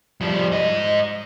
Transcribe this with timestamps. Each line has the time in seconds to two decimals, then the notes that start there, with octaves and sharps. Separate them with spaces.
0.21 F3 G3
0.51 G#2 D#5